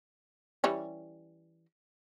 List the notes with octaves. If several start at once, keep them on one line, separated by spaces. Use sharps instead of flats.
E3 G3 C#4